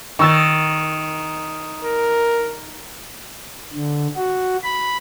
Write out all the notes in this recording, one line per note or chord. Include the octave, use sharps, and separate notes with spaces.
D#3 C#6 E6 A6
A#4
D3
F#4
B5